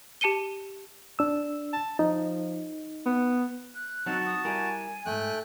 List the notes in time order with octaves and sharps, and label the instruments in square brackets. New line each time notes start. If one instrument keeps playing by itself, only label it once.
[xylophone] G4 A5 C#7 D#7 G7
[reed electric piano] D4 E6
[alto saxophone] A5
[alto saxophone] F3 [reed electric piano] D#4
[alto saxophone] B3
[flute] F#6
[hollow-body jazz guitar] F#3 C4 D#4 [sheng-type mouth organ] F#4 A5
[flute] D#6
[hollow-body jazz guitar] G3 E4 A#4 [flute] G#5
[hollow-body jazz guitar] F2 G#2 [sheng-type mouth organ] A3 G5 F#6